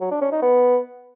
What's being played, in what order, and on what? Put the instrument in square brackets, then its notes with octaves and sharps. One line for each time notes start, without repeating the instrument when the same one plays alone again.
[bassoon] F#3
D4
C#4
D#4
B3